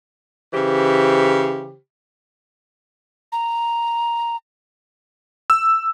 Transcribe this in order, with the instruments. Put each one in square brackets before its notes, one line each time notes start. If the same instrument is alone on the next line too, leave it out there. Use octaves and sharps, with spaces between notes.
[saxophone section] C#3 E3 G4 C5
[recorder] A#5
[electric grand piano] E6